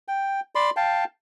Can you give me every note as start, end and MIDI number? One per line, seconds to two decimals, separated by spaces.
0.08 0.40 79
0.55 0.70 74
0.55 0.70 83
0.55 0.70 84
0.76 1.04 77
0.76 1.04 79
0.76 1.04 81